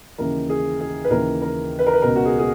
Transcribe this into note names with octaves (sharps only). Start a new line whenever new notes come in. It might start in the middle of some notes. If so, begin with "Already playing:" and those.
D#2 C#3 E3 A#4
G#4
G#4
B4
D#2 C#3 E3 A#4
A#4
B4
A#4
B4
C#2 B2 A#4
F#4
G#4
G#4